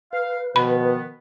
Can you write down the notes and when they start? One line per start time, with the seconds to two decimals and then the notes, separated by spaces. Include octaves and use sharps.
0.13 B4 F5
0.56 B2 D#3 F3 B3 B5